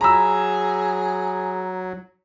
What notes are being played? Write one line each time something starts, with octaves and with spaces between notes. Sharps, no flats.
F#3 G#4 A#5 B5 E6